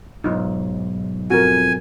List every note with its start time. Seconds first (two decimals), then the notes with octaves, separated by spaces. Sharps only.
0.24 B1 G#2 D#4 F4
1.30 F2 F#4 A#4 G#5